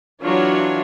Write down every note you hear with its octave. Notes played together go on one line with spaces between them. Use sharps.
E3 F#3 D4 F4 C#5